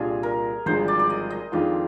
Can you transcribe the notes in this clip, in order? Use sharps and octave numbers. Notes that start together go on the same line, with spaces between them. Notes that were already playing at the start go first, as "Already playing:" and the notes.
Already playing: C2 A#2 G3 D4 F4 G#4
A#4
G#1 G2 D3 F3 G#3 C5
D5
D5
D#5
D#5
F2 D#3 G#3 D4 F4 D5